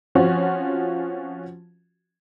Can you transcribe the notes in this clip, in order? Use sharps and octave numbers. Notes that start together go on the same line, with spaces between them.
F3 C4 C#4 F4 F#4